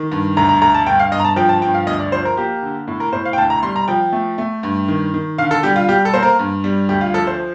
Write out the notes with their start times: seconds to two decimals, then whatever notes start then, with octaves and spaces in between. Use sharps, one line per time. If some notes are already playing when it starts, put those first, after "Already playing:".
Already playing: D#3
0.12 G2
0.37 D2 A#5
0.49 A#5
0.62 D2 A#5
0.74 A5
0.87 G2 G5
0.99 F5
1.12 G2 D#5
1.20 A#5
1.25 A5
1.36 F3 G5
1.49 A5
1.62 G2 G5
1.74 F5
1.87 D2 D#5
2.00 D5
2.12 F3 C5
2.25 A#4
2.37 A#3 G4
2.63 D3
2.88 A2
3.00 A#4
3.12 A2 C5
3.25 F5
3.33 G5
3.38 D2 A5
3.50 A#5
3.63 G3 C6
3.76 A#5
3.88 F3 G5
4.12 A3
4.38 A3
4.63 G2
4.88 D#3
5.14 D#3
5.38 D3 F5
5.51 A4
5.63 G3 G4
5.76 F4
5.89 G3 G4
6.05 A4
6.14 A#3 C5
6.23 A#4
6.39 G2
6.64 G3
6.89 D2 G4
7.01 F4
7.14 F3 A4
7.27 C5